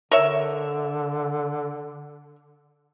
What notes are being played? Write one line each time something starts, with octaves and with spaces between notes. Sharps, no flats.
D3 A#4 C#5 E5